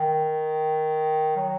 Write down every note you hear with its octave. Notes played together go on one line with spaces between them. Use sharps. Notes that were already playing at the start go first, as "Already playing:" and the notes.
Already playing: D#3
F#3